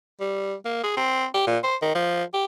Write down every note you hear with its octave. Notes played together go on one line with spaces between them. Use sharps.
G3
A#3
G#4
C4
G4
A#2
C5
D#3
F3
G4